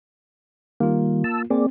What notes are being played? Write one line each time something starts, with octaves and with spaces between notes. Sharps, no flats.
D#3 G3 A#3 F4
A5 E6
A#3 C4 G#4 D5